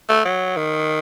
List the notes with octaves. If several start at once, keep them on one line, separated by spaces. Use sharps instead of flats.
A3
F#3
D#3